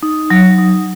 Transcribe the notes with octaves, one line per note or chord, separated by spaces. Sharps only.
D#4
F#3
D#4